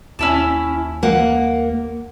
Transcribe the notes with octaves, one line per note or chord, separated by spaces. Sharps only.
D#2 C#4 E4 A5
A#3 F#5